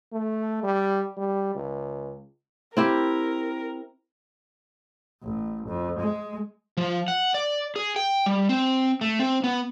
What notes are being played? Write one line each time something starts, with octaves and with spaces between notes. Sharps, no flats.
A3
G3
G3
C#2
C4 E4 G4 A#4
A1
F2
G#3
F3
F#5
D5
G#4
G5
G3
C4
A3
C4
B3